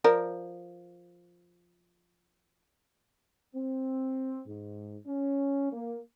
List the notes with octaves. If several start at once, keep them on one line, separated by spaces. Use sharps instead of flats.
F3 A#4 D5
C4
G#2
C#4
A#3